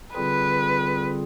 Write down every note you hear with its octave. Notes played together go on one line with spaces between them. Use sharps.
D3 G3 C4 F4 G#4 B4